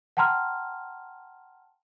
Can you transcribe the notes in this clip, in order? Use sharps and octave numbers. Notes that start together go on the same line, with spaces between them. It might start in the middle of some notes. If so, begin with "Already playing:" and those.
F#5 G5 A5 A#5 C6 F6